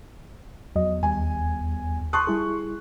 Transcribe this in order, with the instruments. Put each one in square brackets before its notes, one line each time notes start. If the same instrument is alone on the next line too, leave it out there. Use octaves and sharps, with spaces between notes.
[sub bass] E2 [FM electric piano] F#3 D#5
[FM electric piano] D#2 G3 [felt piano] G#5
[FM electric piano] A5 D#6 [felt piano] C6 C#6 F#6
[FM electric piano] G3 E4 G#4